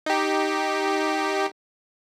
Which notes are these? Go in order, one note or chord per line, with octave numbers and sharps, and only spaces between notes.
D#4 G4